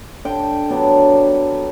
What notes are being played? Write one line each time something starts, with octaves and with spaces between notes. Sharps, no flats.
D3 G5
F#3 B3 D4
D3